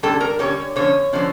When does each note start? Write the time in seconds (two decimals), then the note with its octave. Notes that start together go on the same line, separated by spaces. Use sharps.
0.03 D3 G3 C#4 A4
0.21 A#4
0.39 D3 G3 C#4 C#5
0.76 D3 F3 C#4 C#5
1.12 D3 F3 C#4